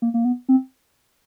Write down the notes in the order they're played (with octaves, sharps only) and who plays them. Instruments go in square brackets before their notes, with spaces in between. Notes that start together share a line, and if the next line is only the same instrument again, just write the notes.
[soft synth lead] A#3
A#3
B3
C4